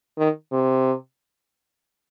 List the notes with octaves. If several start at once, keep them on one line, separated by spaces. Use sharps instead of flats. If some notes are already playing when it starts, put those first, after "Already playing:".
D#3
C3